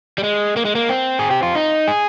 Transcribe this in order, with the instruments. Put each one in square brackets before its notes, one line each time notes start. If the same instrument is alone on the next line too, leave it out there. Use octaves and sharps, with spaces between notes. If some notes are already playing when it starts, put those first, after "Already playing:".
[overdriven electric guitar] G3
G#3
A#3
G#3
A#3
C4
G#4
G4
F4
D#4
G#4